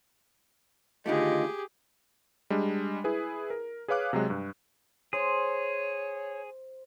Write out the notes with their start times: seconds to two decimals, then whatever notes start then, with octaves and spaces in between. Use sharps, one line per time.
1.06 D3 D#3 A3 F4 G4 G#4 D#5
2.50 G3 G#3 D4
3.04 E4 G#4 B4
3.50 A#4
3.88 G#4 B4 C#5 F5 D6 F#6
4.13 C3 F#3 G#3
4.30 G2
5.13 G#4 C5 C#5